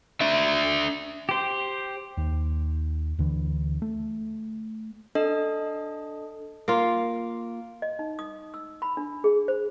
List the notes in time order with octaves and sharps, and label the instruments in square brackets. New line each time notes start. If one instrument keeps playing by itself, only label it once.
[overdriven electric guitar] D4 E5
[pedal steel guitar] G4 C5
[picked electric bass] D#2
D2 D3 E3
A3
[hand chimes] D4 A4 D#5
[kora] A#3 F4
[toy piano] D#5
D#4
D#6
E6
B5
D4
G#4
C5